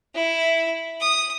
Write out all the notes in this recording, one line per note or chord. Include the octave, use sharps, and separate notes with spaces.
E4
D#6